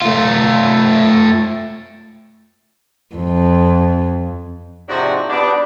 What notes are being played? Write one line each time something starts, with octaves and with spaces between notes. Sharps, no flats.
A3 F4
F2
G#2 C3 F3 D4 F#4
G3 B3 D4